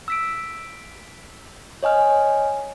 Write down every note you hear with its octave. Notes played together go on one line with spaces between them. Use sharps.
E6 B6 D7
C#5 D#5 G#5 F6